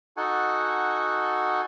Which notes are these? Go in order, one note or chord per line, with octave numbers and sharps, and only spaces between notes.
D#4 F#4 A4 F#5 G#5